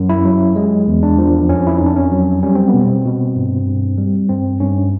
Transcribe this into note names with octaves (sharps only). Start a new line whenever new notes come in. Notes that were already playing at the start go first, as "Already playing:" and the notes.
Already playing: F#2
E4
F#3
G#3
E2
D4
F3
F2 C#4
E4
F2 D#4
D4
C#4
F#3
G3 C#4
C4
B3
B2
C4
B2
G2
G2
G3
G2 C4
G2 C#4